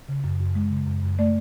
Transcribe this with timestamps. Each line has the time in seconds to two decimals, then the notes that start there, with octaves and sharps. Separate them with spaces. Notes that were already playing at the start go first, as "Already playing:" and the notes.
0.09 C#3
0.24 F#2
0.40 F#2
0.55 G#3
0.71 C#3
0.86 F#2
1.03 F#2
1.19 A3 D5